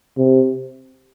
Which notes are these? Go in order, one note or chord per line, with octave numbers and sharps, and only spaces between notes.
C3